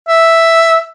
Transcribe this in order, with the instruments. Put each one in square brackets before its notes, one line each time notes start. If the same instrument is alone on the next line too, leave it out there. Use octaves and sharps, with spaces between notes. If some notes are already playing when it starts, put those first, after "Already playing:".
[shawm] E5